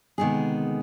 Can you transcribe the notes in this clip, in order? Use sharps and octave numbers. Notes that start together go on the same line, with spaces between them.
D2 C3 D#3 G#3 B3 G#4